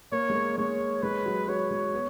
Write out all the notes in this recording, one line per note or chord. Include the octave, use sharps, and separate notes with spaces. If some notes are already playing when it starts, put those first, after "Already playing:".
A#3 C#5
G#3
A#3
G#3 C#5
G#3 B4
F#3
F#3 C#5
G#3
B3